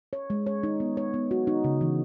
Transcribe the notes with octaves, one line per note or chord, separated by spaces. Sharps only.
C#5
G#3
C#5
D#4
B3
C#5
B3
F#4
D#4
C#3
E3